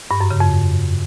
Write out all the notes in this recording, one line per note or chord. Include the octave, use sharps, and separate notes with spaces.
G2
F#2
C#3
F2